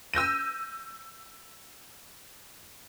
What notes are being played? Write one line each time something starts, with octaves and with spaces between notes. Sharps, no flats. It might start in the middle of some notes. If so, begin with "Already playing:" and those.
E6 G6 A#6 D#7